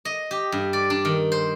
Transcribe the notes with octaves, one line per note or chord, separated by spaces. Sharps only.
D#5
G4
G2
D5
D4
D#3
C5